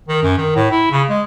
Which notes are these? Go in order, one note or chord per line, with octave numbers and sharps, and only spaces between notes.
D#3
F#2
D#3
A2
E4
C#3
G#3